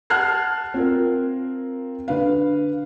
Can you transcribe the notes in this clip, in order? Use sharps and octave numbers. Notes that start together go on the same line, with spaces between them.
F#5 A5 F6 F#6 G#6 C7
C4 F4 A#4
D3 B4 F5